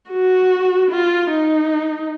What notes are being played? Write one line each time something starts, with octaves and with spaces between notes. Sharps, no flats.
F#4
F4
D#4